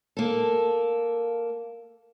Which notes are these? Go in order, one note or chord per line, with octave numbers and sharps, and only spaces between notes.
A#3 A4